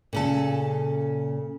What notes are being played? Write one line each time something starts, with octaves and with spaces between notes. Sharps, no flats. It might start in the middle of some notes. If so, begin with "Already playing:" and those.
A#2 C#3 A4